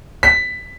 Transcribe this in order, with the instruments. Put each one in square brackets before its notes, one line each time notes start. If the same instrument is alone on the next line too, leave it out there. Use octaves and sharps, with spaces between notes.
[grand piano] B6